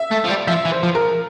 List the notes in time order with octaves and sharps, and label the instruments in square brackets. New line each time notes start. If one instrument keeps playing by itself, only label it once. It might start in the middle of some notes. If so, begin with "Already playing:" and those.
Already playing: [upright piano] E5
[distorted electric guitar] A3
F3
G3
[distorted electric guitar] F3 [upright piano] E5
[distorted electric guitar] E3
[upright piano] C5
[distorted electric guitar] F3
[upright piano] A#4